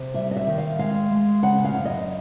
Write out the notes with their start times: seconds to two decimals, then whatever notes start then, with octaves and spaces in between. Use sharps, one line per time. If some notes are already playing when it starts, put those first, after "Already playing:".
Already playing: C3
0.14 G3 E5
0.31 D#5
0.36 E5
0.47 D#3
0.58 F5
0.78 G#3 F5
1.11 G#3
1.42 C#3 F#5
1.65 F5
1.75 F#2
1.85 D#5